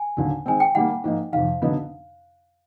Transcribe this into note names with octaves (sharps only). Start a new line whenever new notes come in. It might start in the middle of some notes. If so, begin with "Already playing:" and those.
Already playing: G#5
D#2 D3 F#3
D#3 G#3 C4 G#5
G5
D#3 G3 A#3 F#5
G#2 F3 A#3 D#4
F2 C3 D#3 F5
D3 F#3 B3 D#4